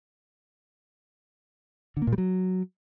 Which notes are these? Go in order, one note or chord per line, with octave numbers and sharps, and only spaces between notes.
D3
A#3
A#2
G3
F#3